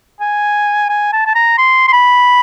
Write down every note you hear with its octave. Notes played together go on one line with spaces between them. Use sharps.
G#5
G#5
A5
A5
A#5
C6
C6
B5